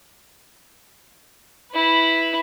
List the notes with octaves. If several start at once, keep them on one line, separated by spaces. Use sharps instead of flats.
E4 B4